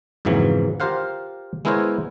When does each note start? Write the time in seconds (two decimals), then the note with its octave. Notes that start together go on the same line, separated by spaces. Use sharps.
0.25 F2 G#2 C#3 E3 F#3 A#3
0.80 F4 G4 A#4 C5 F5 F#5
1.65 G#3 B3 E4 A#4 C5 C#5